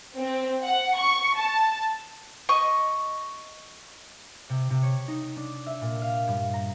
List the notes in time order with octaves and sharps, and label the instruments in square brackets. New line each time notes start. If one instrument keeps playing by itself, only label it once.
[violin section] C4
F#5
C#6
A5
[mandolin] D#5 C#6
[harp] C3
C3
C#5
D#4
D4
E5
A#2
F5
G2
A#5